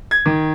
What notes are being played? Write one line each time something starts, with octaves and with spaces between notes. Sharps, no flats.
G#6
D#3